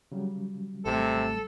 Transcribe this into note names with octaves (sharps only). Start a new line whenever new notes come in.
C#3 F#3 G3
G#1 C3 A3 A4